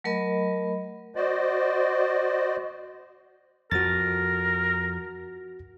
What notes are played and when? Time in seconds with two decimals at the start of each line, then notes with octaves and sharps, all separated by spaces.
0.04 F#3 A3 A#4 D#5 B5
1.16 F#4 C5 D5 D#5
3.72 F2 F3 F#4 A#4 A6